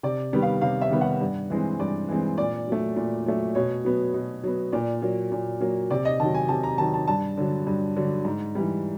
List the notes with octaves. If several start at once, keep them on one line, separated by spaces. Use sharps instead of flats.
C3 D5
D#3 G3 B3
F5
C3 F5
E5
D#3 G3 B3
F#5
G2
E3 G#3 C4
G2 D5
E3 G#3 C4
A#2 D5
F#3 A3
A#2
F#3 A3
B2 C#5
F#3 B3
B2
F#3 B3
A#2 D5
F#3 A#3
A#2
F#3 A#3
C3 D5
D#5
D#3 F#3 A5
G#5
C3 A5
A#5
D#3 F#3 A5
A5
G2 A5
D3 F#3
G2
D3 F#3
G#2
E3 G3